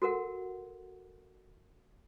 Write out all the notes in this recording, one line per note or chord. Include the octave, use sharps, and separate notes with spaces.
F#4 A4 A#4 F#5